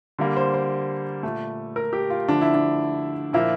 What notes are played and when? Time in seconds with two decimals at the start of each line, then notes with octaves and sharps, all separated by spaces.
0.19 D3 G3 A#3
0.36 C5
0.54 C5
1.23 A#2 A3
1.76 A#4
1.93 G4
2.10 F4
2.28 D3 F3 A3 D4
2.41 E4
2.54 D4
3.33 A#2 F3 A#3 E4